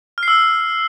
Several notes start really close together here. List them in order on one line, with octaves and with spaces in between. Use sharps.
F6 C7 E6